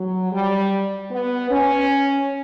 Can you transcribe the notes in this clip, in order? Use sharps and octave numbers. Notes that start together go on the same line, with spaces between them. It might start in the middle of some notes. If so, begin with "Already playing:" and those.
Already playing: F#3
G3
B3
C#4